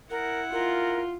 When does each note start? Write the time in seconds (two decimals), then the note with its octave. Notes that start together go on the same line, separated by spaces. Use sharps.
0.10 E4 A#4 F#5
0.52 F4 A#4